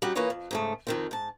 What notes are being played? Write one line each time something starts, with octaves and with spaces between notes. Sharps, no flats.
G3 C#4 D#4 F#4 G4
E3 A#3 F4 B4 C#5 D#5
F2
G#2 C#3 A3
F2 D#3 C4
G#2 A5